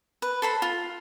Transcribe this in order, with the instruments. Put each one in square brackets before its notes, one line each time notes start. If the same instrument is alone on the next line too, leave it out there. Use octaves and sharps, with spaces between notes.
[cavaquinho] B4
A4 C5 B5
F4